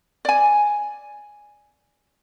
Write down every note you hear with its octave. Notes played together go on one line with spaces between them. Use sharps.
D5 G#5